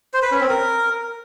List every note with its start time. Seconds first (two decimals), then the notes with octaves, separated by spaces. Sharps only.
0.14 C5
0.23 B4
0.32 C#4
0.41 C4
0.50 A#4